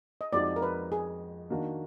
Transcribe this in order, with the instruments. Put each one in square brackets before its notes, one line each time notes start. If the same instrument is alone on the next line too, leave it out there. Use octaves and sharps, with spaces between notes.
[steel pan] D#5
[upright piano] F2 F3 G#3 D#4 F#4 [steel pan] D5
[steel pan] A#4
B4
G#4
[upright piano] D#3 A#3 D4 F#4